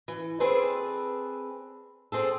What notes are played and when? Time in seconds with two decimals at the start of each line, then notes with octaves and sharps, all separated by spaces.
0.08 E3
0.40 C4 G#4 A4 B4 D5
2.12 C4 G#4 A4